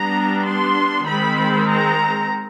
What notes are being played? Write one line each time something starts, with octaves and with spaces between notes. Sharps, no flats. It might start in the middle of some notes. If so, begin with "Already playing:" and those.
Already playing: G3 B3 D4 A#5
C6
D#3 G#3 C4 B5
A#5